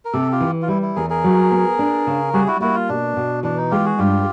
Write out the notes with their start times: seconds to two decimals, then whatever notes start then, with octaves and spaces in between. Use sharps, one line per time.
0.05 A#4
0.13 C3 G4 A4
0.32 F4 G4
0.41 E3
0.62 F4
0.68 G3 E4
0.82 E4
0.96 E2 G#4 A#4
1.10 G#4 A#4
1.24 F#3
1.51 B3
1.79 D4
2.07 C#3
2.33 G3 F#4 G#4
2.47 E4 F#4
2.61 A#3 E4 F#4
2.75 F4
2.89 B2 D4
3.16 B2
3.43 E3 D4
3.57 D#4
3.71 G#3 F4 G4
3.85 F#4 G#4
3.99 G2 F4 G4